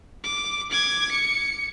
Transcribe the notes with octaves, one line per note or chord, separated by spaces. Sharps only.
D6
D6 G#6
C#7